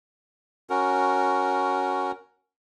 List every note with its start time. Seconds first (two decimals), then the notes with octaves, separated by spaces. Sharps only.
0.70 C#4 F#4 A#4